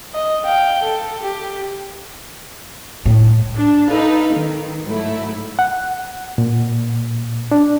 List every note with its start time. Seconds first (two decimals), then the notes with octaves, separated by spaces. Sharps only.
0.14 D#5
0.45 F5 G5
0.82 A4
1.22 G4
3.06 A2
3.56 D4
3.87 D#4 A4 B4 F5
4.35 D#3
4.85 G#2 F#3 A3 E4
5.59 F#5
6.38 A#2
7.52 D4